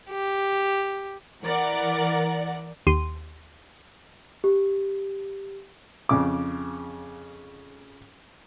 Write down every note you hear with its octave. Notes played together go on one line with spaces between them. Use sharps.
G4
E3 A#4 D5 F#5
D#2 G4 C6 D#7
G4
F2 C#3 D6